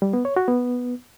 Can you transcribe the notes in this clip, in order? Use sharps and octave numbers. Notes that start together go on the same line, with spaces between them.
G3
B3
C#5
F#4
B3